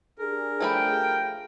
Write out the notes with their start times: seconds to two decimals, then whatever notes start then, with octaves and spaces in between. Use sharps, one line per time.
0.18 D4 G4 G#4 A#4
0.61 F3 A3 G5 B5